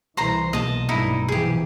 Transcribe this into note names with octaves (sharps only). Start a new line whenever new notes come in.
C2 E3 C5 A#5 C6
B1 A#3 D#5 A5
G2 A3 D#4 E4
C3 E3 F3 G4 G#4